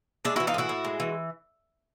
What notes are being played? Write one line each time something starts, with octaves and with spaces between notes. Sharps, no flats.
G#3 D4 E4
E3 E4 F#4
D#4 F4
A2 E4 F#4
A2
G#3
E3